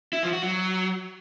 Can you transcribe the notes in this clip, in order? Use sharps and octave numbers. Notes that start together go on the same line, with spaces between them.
E4
F3
F#4
F#3